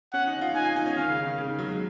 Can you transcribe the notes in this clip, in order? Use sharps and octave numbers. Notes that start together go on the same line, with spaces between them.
C#4 F#5
D#4
F4
D#4 G#5
F4
D#4
C#4
D#3 F5
C#3
D#3
C#3
D#3
F#3
G#3